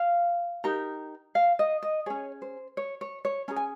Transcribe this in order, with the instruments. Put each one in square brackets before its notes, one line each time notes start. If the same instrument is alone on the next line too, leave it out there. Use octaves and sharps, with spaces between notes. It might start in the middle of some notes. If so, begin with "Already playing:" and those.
Already playing: [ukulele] F5
D#4 G4 A#4
F5
D#5
D#5
C#4 G#4 C#5
C5
C#5
C#5
C#5
C#4 G#4 A#5
G#5